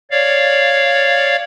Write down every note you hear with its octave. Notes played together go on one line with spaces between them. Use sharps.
C#5 D5 F5